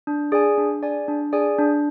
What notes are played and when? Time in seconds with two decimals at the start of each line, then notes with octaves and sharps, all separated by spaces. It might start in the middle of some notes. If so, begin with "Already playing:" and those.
0.07 D4
0.32 G#4 D5 G#5
0.58 D4
0.83 G#4 D5 G#5
1.08 D4
1.33 G#4 D5 G#5
1.58 D4